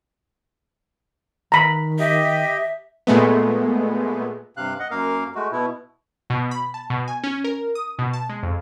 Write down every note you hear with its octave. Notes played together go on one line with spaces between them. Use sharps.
D#3 A#5 B5
G4 D#5 E5
A#2 G#3 A3 B3
G2 C3 F5 F#6
D#5 F#5
F#2 A#3 A#4 F5
G#3 A3 F#4
B2 E4
B2
B5
A5
B2
G#5
C#4
A#4
D#6
B2
A5
G#3
F2